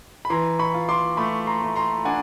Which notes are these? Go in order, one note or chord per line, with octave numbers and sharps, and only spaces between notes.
B5
E3 A#5 C6
B5 C#6
F4
C6 D6
A3 B5 C#6
A#5 C6
A3
A#5 C6
D4 F#5 G#5